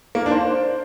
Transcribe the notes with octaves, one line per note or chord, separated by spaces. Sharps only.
A#3
A#4
D4
C5